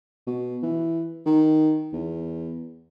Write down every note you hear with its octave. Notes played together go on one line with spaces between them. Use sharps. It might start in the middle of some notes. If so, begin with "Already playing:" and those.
B2
E3
D#3
E2